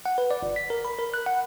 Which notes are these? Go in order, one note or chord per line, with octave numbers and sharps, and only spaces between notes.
F#5
B4
D5
G1
B6
A#4
B5
A#4
F#6
F#5